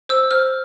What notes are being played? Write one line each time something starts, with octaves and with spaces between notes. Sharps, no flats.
C5 E6
C5 F6